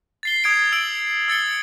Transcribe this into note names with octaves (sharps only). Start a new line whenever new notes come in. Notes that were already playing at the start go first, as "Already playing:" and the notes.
A6 C7 G7
D#6 G#6 C7 D7
E6 D7 F#7
E6 A6 C#7 G7